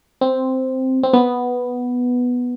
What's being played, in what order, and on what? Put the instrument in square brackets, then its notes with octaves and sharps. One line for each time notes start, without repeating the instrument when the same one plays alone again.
[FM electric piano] C4
C4
B3